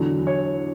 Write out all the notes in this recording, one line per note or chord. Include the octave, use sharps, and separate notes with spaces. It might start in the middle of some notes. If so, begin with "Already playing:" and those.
Already playing: E2 D3 F#3
C#5